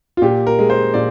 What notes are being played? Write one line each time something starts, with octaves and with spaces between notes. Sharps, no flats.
F4
A#2 G4
A#4
G#3
C5
A#2 D5